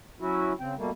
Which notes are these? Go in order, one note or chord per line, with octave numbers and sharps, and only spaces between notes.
F#3 C#4 E4 F#4
C#3 C4 G5
B2 G3 A3 A#3